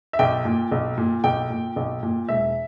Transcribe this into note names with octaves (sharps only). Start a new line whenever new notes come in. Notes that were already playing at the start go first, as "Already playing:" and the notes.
E5
B1 G5
A#2
B1
A#2
B1 G5
A#2
B1
A#2
E1 E5